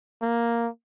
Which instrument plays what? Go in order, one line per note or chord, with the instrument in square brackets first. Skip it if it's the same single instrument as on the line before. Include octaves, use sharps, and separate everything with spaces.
[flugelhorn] A#3